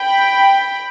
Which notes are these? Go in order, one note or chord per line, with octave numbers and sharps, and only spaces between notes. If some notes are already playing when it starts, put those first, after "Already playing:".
Already playing: G5 B5